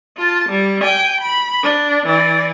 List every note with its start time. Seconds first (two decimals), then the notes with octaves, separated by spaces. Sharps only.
0.17 F4 A5
0.49 G3
0.82 G5 G#5
1.21 B5
1.63 D4
2.07 E3 D5